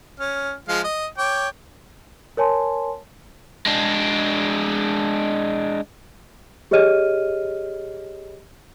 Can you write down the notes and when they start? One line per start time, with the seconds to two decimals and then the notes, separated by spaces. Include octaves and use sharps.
0.20 C#4 F6
0.69 F3 G#3 F5
0.84 D#5
1.18 C#5 G5 D6
2.37 A#4 C#5 G#5 A5 C6
3.66 G#3 D4
6.71 G4 G#4 C#5 D#5 F6 D#7